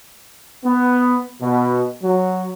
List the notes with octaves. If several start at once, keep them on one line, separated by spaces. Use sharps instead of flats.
B3
B2
F#3